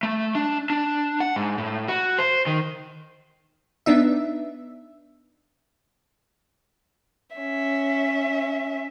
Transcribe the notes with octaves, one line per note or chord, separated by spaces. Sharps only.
A3
D4
D4
F#5
G#2
A2
F#4
C5
D#3
B3 D4 D#4 E5
C#4 E5